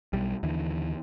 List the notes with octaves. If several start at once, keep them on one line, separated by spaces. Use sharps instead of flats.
B1 G3
D#2 D3 E3